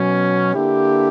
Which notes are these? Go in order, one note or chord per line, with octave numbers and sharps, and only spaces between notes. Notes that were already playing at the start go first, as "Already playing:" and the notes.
Already playing: B2 F#3 C#4
D3 A#3 E4 G4